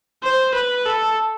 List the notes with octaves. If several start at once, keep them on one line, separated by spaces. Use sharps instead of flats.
C5
B4
A4